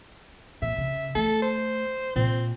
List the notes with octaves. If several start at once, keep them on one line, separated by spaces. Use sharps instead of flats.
A#2 E5
C#3
A3 A4
C5
A#2 C4